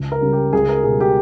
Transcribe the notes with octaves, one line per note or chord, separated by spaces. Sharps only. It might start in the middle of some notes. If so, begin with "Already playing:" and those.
Already playing: C#2
A#4
C#3 G3
G4
C#2 G#4
A#4
B2 G3 G#4
G4